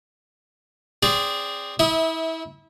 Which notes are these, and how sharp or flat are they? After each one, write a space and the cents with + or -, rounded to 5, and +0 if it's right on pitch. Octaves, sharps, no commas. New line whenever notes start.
C4 +0 G#4 -20 D5 -20
E4 -30 E5 -20 D#6 +0